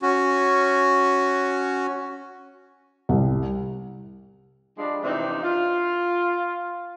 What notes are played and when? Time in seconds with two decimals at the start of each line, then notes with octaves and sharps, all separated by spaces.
0.02 C#4 F#4
3.09 C2
4.78 F3 G3 G#3 D4
5.03 F2 C3 E3 C4 D4 D#4
5.43 F4